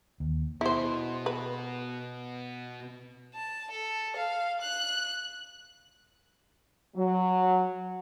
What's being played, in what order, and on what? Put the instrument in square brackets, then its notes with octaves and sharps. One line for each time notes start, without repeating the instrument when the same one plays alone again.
[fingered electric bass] D#2
[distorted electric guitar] B2 [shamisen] E4 C5
[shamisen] B4
[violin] A5
A4
F5
F#6
[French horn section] F#3